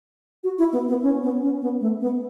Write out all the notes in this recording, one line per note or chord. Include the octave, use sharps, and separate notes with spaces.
F#4
E4
B3
B3
C#4
B3
C#4
B3
A3
B3